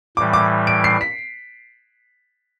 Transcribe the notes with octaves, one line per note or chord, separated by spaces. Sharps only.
A2 E3 G3 D6
D6
D7
C7
B6